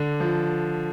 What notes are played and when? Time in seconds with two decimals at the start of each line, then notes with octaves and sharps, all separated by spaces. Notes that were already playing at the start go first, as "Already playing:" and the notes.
Already playing: D3
0.20 F3